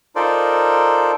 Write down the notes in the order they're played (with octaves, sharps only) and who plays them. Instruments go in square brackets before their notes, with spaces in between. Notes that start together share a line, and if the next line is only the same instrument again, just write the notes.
[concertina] D#4 F4 A4 A#4 C5 D5